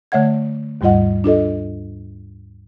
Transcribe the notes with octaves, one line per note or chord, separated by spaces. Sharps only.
D3 A3 C#5 E5 F#5 G#6
D#2 G#2 G3 F4 D#5 F#5
D4 F4 A4 D#5